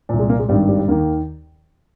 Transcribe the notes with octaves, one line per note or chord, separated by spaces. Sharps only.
C2 A#2
G#3
A#3
G#3
G#1 G2 D#3 G3
G3
G3
D#2 D#3 A#3